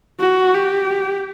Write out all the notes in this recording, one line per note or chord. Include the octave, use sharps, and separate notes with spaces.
F#4
G4